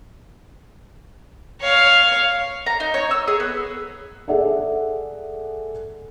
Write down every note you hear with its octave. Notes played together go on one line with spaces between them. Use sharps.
C#5 F5
A#5
D#4
C#5
E6
G#4
B3
G#4 A4 D5 E5 F#5